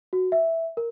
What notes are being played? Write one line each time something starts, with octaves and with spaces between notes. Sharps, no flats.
F#4
E5
A#4